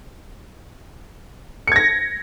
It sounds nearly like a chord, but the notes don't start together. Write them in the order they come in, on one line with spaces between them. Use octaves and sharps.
C#7 G#6 A#6